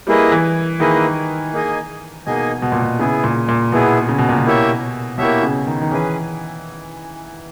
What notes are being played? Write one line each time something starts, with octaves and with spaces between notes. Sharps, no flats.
G3 A#3 E4 G#4 B4 D#5
E3
D#3 A#3 E4 G#4 B4 D#5
A#3 D#4 G#4 D#5 G#5
B2 A#3 D#4 G#4 D#5 G#5
B2
A#2
B2
C#3 B3 E4 G#4
A#2
A#2
B2 B3 E4 G#4
C#3
B2
A#2
B2
A#3 E4 G4 C#5 E5
B2 A#3 E4 G4 C#5 E5
C#3
D#3
D#3
E3 C#4 G#4 B4